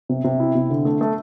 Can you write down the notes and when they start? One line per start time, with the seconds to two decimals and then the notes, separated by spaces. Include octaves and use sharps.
0.09 C3
0.24 C3
0.40 E4
0.55 C3
0.70 D3
0.85 A3
1.01 A3